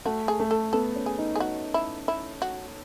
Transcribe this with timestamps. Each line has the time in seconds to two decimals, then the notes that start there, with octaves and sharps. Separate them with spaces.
0.05 A3 F#4
0.28 G#4
0.40 A3
0.51 A4
0.73 B3 A4
0.96 C#4
1.06 G#4
1.18 D#4
1.36 G#4
1.40 F#4
1.74 E4
2.08 E4
2.42 F#4